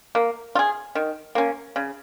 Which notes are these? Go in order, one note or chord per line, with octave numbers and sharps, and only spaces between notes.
A#3
F4
G#4
D#3
A#3 C#4
C#3